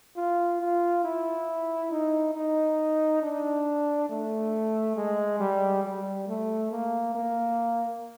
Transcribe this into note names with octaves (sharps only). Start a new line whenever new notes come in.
F4
F4
E4
D#4
D#4
D4
A3
G#3
G3
G3
A3
A#3
A#3